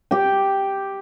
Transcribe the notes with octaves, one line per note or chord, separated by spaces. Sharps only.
G4 G5